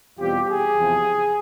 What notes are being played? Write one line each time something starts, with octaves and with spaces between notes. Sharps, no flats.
E2 B2 G3 C4 F4 G4
G#4
E2 C3 F3